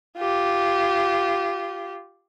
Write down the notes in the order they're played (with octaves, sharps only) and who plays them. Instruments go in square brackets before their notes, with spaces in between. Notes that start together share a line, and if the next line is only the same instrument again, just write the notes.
[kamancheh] F4 G4